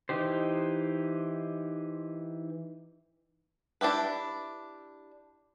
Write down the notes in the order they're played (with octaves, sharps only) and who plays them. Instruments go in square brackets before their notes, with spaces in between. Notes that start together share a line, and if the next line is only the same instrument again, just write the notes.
[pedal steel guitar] E3 D#4 G4 C5
[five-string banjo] D4 E4 G4 B4